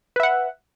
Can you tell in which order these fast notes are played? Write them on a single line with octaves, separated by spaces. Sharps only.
B4 E5 F#5